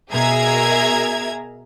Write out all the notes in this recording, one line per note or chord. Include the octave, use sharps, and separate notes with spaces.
B2 G#4 A#4 E5 A#5 G#6